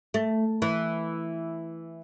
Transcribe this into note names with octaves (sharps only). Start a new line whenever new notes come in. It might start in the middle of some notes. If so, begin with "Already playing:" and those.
A3
E3